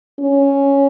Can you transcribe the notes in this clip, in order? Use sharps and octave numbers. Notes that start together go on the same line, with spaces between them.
C#4